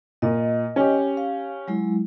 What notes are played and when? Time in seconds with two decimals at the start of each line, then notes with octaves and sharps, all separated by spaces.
0.22 A#2 D#5
0.76 C#4 G4
1.17 F5
1.68 F#3 G#3 E4